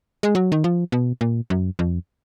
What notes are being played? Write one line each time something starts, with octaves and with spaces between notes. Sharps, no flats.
G#3
F#3
D#3
F3
B2
A#2
F#2
F2